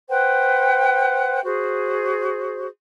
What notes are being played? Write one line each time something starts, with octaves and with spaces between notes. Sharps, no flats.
B4 C5 F#5 G5
F#4 G#4 C5